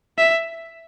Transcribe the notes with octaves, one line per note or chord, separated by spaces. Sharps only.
E5